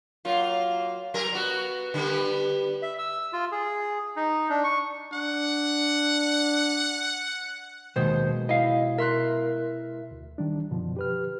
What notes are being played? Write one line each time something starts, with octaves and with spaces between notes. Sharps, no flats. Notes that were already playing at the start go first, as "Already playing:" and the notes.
F#3 A#3 F4
F#3 A#4
B3 F#4
D3 G3 B3
E5
E6
F4
G#4
D#4
D4
C#6
D4 F#5
D#2 B2 G#3 C5
E4 D#5 F5
A#4 E5 C6 F#6
D2
D#3 G3 D4
F#2 B2 D3 F3
G4 B4 F6